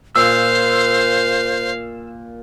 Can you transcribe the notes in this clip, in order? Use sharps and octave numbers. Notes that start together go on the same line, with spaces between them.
A#2 C5 F5 E6